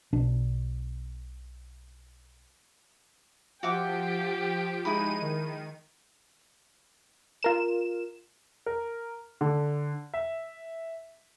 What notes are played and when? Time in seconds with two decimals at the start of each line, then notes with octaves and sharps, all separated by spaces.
0.13 B1 B2 D4
3.63 F3 F#4 G4 E5 G5 D6
4.85 G#3 D#4 E4 B5 D#7
5.21 D#3
7.43 F4 A#4 E7
8.66 A#4
9.41 D3
10.14 E5